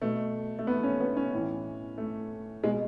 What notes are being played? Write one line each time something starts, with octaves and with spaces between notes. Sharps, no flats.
B2 A3
A3
B3
C#4
B3
C#4
A2 E3
A3
B2 G#3